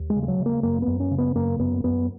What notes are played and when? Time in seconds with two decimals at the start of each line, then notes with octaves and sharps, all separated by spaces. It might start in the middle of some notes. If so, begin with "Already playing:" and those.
Already playing: D#2
0.10 G#3
0.16 C#3
0.23 G#3
0.28 F#3
0.40 C#3
0.46 A#3
0.63 F#2 A#3
0.82 B3
0.87 F#2
1.00 C#4
1.11 C#3
1.18 B3
1.35 F#2 A#3
1.59 F#2 B3
1.84 F#2 B3